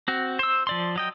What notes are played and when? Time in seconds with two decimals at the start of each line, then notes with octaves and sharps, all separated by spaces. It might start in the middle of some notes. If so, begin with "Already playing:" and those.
0.08 C4 F#4
0.39 C5 E6
0.67 F3 D5 C6
0.96 F#3 D#5 G5